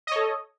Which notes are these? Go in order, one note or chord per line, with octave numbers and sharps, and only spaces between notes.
A4 C#5 D#5